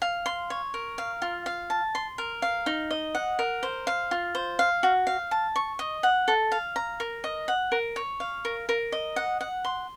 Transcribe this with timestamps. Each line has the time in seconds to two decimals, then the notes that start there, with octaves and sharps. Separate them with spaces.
0.02 F5
0.26 C6
0.50 C#5
0.74 A#4
0.98 F5
1.22 F4
1.46 F5
1.70 A5
1.95 C6
2.18 A#4
2.42 F5
2.66 D#4
2.91 D#5
3.15 F#5
3.39 A#4
3.63 C5
3.87 F5
4.11 F4
4.35 C5
4.59 F5
4.83 F#4
5.07 F5
5.31 A5
5.56 C#6
5.79 D#5
6.03 F#5
6.28 A4
6.52 F5
6.76 A#5
7.00 A#4
7.24 D#5
7.48 F#5
7.72 A#4
7.96 C#5
8.20 F5
8.45 A#4
8.69 A#4
8.92 D#5
9.16 F#5
9.41 F#5
9.65 C6